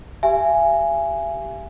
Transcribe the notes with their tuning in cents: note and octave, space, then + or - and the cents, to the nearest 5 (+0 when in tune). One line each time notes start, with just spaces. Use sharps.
G4 +0 E5 +40 G#5 +0